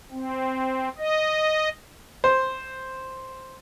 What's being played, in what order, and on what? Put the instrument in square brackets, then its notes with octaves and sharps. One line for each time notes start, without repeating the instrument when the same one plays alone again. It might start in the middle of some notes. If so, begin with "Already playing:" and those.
[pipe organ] C4
D#5
[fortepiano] C5